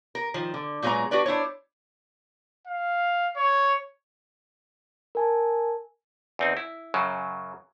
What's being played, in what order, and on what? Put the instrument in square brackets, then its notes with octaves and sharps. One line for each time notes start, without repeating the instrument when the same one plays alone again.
[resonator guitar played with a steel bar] A#4
D#3 F3
D3
A#2 F#3 G#3 B3 G#4 A#5
D4 F#4 G4 B4 D5
D4 E4 C5 C#5
[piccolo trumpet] F5
C#5
[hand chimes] A#4 G#5 A5
[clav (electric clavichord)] E2 C4 D#4
E4
F#2 C#3 F#3